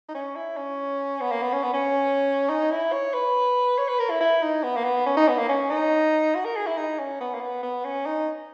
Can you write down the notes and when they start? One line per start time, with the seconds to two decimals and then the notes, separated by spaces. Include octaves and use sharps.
0.09 D#4
0.14 C#4
0.36 E4
0.57 C#4
1.21 B3
1.31 A#3
1.42 B3
1.53 C#4
1.63 B3
1.73 C#4
2.49 D#4
2.71 E4
2.92 C#5
3.13 B4
3.78 C#5
3.89 B4
3.99 A#4
4.10 E4
4.20 E4
4.42 D#4
4.63 B3
4.77 A#3
4.84 B3
5.06 C#4
5.17 D#4
5.28 B3
5.38 A#3
5.49 C#4
5.70 D#4
6.35 F#4
6.45 A#4
6.56 G#4
6.67 E4
6.77 D#4
6.99 C#4
7.21 B3
7.34 A#3
7.41 B3
7.63 B3
7.84 C#4
8.06 D#4